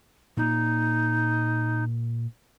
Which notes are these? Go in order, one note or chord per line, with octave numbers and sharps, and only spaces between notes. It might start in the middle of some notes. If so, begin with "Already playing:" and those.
A#2 A#3 D#4